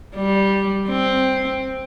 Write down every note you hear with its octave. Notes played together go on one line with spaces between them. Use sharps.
G3
C4